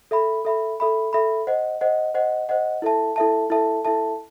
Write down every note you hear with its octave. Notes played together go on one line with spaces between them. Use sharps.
A4 E5 B5
A4 E5 B5
A4 E5 B5
A4 E5 B5
C5 D#5 F#5
C5 D#5 F#5
C5 D#5 F#5
C5 D#5 F#5
E4 A4 E5 A5
E4 A4 E5 A5
E4 A4 E5 A5
E4 A4 E5 A5